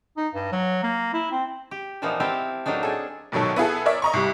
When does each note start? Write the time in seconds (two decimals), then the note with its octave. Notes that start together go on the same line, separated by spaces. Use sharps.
0.17 D#4
0.34 G2
0.52 F#3
0.83 A#3
1.13 E4
1.31 C4
1.71 G4
2.02 A#2 E3 F3 A#3 B3 D#4
2.20 C4 E4 G4 F5 A5
2.66 A2 F#3 A#3 D4 D#4
2.83 D4 G#4 A4
3.32 A#1 B2 D#3 F#3 A4
3.56 B3 E4 G#4 A4
3.86 A#4 C#5 D5 E5
4.02 D#5 A#5 C#6
4.13 C2 G3